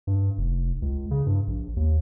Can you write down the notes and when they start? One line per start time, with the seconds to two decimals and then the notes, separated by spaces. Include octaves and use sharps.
0.07 G2
0.38 F1
0.82 C#2
1.11 C#3
1.26 G2
1.48 A#1
1.77 D#2